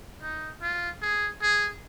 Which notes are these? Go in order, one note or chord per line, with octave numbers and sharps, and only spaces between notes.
D#4
F4
G#4
G#4